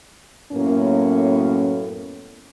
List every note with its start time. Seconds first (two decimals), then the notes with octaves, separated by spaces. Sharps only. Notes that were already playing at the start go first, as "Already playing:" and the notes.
0.52 F#2 A2 A#3 B3 C#4